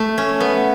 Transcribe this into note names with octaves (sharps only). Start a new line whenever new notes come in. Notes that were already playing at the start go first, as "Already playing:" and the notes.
Already playing: A3
C#4
B3